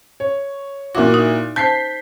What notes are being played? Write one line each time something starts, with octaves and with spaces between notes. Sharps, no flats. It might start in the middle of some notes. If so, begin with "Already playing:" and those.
C#5
A#2 E4 F#4 D6
D#4
C5 A5 G6 B6 C7